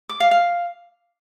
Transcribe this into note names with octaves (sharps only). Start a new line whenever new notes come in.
D6
F5
F5